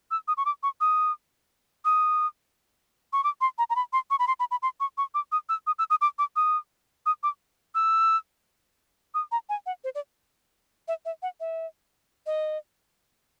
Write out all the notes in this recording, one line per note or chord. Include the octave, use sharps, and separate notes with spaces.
E6
D#6
C#6
D6
C#6
D#6
D#6
C#6
D6
C6
A#5
A#5
B5
C6
C#6
B5
C6
B5
B5
C6
C#6
C#6
D6
D#6
E6
D#6
E6
D#6
D6
D6
D#6
D#6
D6
E6
D#6
A#5
G#5
F#5
C5
D5
E5
E5
F#5
E5
D#5